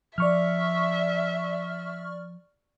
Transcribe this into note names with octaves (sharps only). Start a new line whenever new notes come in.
F3 D5 E5 C#6 F6